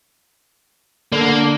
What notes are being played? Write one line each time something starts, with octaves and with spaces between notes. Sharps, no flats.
D3 A#3